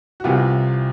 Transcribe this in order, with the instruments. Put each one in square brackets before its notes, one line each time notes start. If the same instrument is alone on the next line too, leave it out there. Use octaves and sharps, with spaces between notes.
[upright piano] F#4
C2 C3 E3 F4 G4